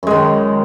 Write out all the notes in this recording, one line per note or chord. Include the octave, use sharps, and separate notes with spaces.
F#2 D#3 G#3